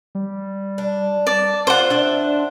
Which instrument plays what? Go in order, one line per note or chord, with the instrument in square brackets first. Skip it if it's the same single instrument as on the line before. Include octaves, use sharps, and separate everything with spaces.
[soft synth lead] G3
[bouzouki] D4
[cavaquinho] D5 [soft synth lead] A5
[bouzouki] D4 F4 [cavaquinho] C5 F#5
[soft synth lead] D4 [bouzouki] D5 E5